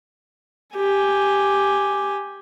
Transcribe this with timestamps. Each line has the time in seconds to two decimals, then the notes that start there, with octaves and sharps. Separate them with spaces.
0.76 G4 G#5